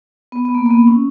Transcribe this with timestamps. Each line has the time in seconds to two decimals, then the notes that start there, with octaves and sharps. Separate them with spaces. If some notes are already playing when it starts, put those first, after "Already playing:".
0.32 B3
0.45 B3
0.54 A#3
0.66 A#3
0.71 B3
0.87 C#4